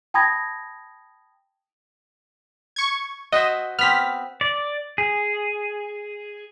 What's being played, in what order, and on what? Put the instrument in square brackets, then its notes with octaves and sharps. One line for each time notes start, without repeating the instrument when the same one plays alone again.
[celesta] G5 A5 B5 D#6 G#6 A#6
[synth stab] C#6 G#6
[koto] F#4 C5 E5 [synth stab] D#5
[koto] B3 C4 [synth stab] F6 B6
[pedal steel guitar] D5
G#4